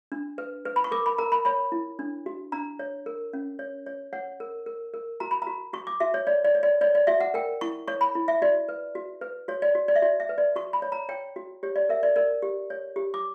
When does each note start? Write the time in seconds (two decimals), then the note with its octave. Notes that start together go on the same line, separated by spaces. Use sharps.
0.12 D4
0.38 B4
0.65 B4
0.76 B5
0.84 C#6
0.91 A#4 D6
1.06 B5
1.18 A#4 A#5
1.32 B5
1.45 C#5 B5
1.72 E4
1.99 D4
2.26 F#4
2.52 D4 A#5
2.79 C#5
3.06 A#4
3.33 C#4
3.59 C#5
3.86 C#5
4.13 C#5 F#5
4.40 A#4
4.66 A#4
4.94 A#4
5.20 F#4 A#5
5.31 B5
5.42 F#4 A#5
5.73 F#4 C#6
5.87 D6
6.00 F#4 E5
6.14 C#5
6.27 C#5 D5
6.45 D5
6.55 C#5
6.63 D5
6.81 C#5 D5
6.95 D5
7.07 F#4 E5
7.20 F#5
7.34 A#4 G5
7.61 E4 C#6
7.88 C#5 C#6
8.01 B5
8.15 E4
8.28 E5
8.42 F#4 D5
8.69 B4
8.95 F#4
9.21 B4
9.48 F#4 C#5
9.62 D5
9.75 F#4
9.88 D5
9.96 E5
10.02 F#4 D5
10.20 E5
10.29 B4
10.38 D5
10.56 F#4 C#6
10.73 B5
10.82 C#5
10.92 A#5
11.09 C#5 G5
11.36 F#4
11.63 G4 C#5
11.76 D5
11.89 A#4 E5
12.03 D5
12.16 A#4 D5
12.42 G4
12.70 C#5
12.96 G4
13.14 D6